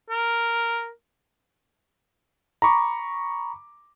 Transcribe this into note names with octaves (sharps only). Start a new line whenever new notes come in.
A#4
A#5 B5 C#6 D6